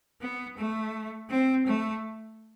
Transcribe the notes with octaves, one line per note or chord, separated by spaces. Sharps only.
B3
A3
C4
A3